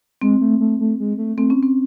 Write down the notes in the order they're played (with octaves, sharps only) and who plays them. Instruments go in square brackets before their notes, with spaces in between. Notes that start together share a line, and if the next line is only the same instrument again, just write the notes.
[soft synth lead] G#3 [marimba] C4
[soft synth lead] A3
A3
A3
G#3
A3
[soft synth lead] A3 [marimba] C4
[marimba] C#4
C4